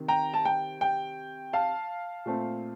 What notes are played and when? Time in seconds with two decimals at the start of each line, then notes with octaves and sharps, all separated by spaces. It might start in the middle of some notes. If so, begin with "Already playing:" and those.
Already playing: C3 D#3
0.08 G5 A#5
0.34 A5
0.45 G5
0.81 G5
1.53 F5 A5
2.26 A#2 A3 C4